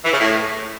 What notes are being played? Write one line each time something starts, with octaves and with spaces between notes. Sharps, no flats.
E3
C#3
A2